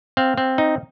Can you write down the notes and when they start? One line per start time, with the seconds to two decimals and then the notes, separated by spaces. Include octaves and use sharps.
0.17 C4 F5
0.38 C4
0.58 D#4